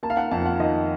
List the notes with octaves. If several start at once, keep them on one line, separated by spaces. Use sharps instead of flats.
A#3 A5
F5
F#5
F2 A5
F#5
D#3 D#5